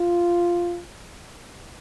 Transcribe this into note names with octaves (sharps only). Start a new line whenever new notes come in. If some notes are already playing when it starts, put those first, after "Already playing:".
Already playing: F4